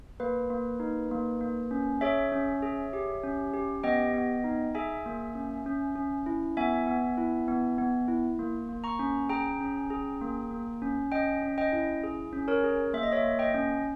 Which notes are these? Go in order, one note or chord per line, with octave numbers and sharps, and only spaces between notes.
A#3 B4
A#3
D#4
A#3
A#3
C#4
G#4 C#5 E5
C#4
G#4
G4
C#4
G4
B3 D#5 G5
B3
D#4
G#4 E5 G#5
A#3
C#4
C#4
C#4
E4
B3 E5 G#5
B3
E4
B3
B3
E4
A#3
A#3
A#5 C#6
C#4
G#4 G5 A#5
C#4
G#4
A#3
A#3
C#4
C#4 D#5 G5
C#4
D#5 G5
E4
G#4
C#4
A#4 C#5
G#4
A#3 E5
D#5
C#5 E5
A#3
D#5 G5
C#4